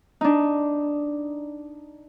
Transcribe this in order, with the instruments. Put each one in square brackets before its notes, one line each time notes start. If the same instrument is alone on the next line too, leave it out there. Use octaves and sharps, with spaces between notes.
[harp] D4 D#4